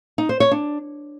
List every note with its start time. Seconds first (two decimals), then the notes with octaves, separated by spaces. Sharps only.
0.18 D#4
0.29 C5
0.40 C#5
0.51 D4